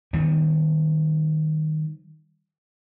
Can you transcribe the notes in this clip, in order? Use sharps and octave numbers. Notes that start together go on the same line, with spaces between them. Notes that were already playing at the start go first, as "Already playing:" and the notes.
D#3 G3 B3